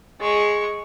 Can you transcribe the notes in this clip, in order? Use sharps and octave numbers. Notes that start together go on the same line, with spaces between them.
G#3 C#6